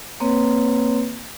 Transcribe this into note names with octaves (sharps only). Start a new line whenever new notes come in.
A#3 C4 B4 C#5